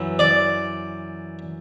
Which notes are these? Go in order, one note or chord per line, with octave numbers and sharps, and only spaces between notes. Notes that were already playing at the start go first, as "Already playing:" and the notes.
Already playing: F#2 E3
D5